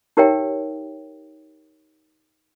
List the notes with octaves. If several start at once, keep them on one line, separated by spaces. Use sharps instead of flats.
D#4 G4 A#4 C#5 E5 G5